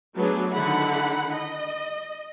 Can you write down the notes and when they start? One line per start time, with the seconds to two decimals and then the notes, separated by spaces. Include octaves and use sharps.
0.16 F#3 A3 B3 D4 G#4
0.51 D3 D#3 D#4 E4 F#5 B5
1.31 D#5